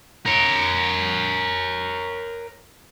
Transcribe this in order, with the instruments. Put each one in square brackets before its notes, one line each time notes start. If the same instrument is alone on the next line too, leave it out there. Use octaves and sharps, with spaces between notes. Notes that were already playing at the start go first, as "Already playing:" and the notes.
[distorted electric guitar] A#4 C#5